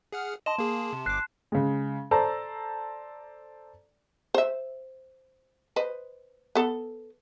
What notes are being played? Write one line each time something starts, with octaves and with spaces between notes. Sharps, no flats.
G#4 F#5 F6
D#5 A5 C6 E7
A#3 G#4
C3
G1 D6 F#6 C7
C#3 G#3
A4 C5 D5 A5 A#5
C5 E5
B4 C5 D#5
B3 A4